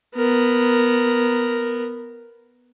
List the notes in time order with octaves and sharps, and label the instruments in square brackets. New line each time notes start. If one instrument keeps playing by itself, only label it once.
[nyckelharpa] B3 A#4